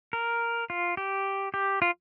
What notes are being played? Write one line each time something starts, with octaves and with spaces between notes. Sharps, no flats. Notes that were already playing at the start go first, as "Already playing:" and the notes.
A#4
F4
G4
G4
F4